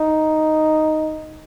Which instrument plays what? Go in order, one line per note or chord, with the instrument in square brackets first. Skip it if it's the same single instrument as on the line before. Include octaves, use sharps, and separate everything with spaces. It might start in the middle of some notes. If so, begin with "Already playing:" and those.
Already playing: [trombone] D#4